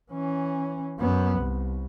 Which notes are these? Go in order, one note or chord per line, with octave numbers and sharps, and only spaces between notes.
E3 C#4
F#2 B3
C2